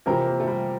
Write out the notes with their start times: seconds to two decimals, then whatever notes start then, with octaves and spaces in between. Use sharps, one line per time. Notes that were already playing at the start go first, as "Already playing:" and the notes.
0.06 C3 E3 F3 C4 G4 A#4
0.26 A#3
0.40 A3
0.47 G3